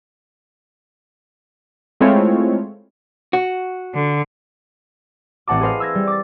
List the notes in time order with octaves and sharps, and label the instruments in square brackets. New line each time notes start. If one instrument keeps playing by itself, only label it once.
[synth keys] G#3 A3 C4 E4 F4 C#5
[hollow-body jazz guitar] F#4
[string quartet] D3
[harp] A1 C4 F#5 A5 D6
G#4 B4 C5 D#5 F5
E6 G#6 A#6
G3
D6 A6